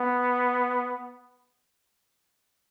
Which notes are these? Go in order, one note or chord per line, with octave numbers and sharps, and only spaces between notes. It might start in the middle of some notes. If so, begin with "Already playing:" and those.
Already playing: B3